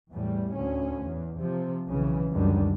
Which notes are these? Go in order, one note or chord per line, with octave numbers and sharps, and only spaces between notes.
E2 A2 G3
D2 C#4
E2
C3 F3
B1 C#3 E3
C#2 F#2 D3 D#3 G3